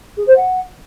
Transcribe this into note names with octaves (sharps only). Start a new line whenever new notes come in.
G#4
C5
F#5